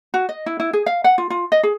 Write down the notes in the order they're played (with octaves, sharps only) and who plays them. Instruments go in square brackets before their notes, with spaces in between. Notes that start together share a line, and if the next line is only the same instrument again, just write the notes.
[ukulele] F#4
D#5
E4
E4
G#4
F5
F#5
F4
F4
D#5
G#4